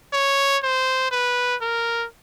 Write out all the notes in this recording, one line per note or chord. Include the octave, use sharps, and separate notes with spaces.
C#5
C5
B4
A#4